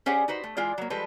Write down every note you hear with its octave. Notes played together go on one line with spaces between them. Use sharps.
C#4 G4 G#4 C5 D5 F#5
D#4 F#4 B4 C5
A3
E3 G#3 F4 G#4 D5
F#3 A#3
F3 G3 G#3 A4 B4